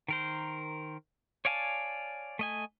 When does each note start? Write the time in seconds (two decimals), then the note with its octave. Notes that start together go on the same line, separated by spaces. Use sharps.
0.08 D#3 A#4 C5
1.45 C#5 D5 F5 G#5 A5
2.39 A3 D#5 G#5